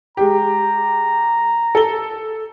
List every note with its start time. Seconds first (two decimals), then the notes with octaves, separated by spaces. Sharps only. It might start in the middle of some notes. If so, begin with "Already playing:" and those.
0.17 G#3 G4 A#5
1.75 A4 G7